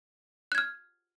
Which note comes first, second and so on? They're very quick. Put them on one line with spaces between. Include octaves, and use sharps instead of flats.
F#6 G#6 F6